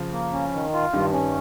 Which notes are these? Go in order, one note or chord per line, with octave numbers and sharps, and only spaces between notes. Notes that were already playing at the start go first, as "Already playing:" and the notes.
Already playing: C#3 F3
A#3
C#4
D#3
F4
G2 D#3 G3
C#4